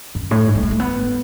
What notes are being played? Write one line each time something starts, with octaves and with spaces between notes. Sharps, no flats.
F#2
A2
G#2
F#3
G#3
A3
B3